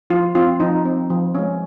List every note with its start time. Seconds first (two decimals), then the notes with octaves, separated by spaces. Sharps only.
0.10 F3 F4
0.35 C4 F4
0.60 F3 D#4
0.85 C4
1.10 F3
1.35 G#3 C#4